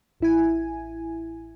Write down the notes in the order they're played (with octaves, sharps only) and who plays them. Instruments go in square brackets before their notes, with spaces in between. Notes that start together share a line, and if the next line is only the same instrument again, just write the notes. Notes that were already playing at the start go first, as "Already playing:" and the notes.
[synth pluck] A1 E4 G#5